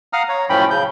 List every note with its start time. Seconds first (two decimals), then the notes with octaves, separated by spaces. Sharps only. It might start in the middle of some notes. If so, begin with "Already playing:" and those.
0.13 F5 F#5 A#5 D#6 F6
0.29 C#5 A#5
0.49 F#2 A2 F3 C#4 G5 B5
0.71 C#3 G6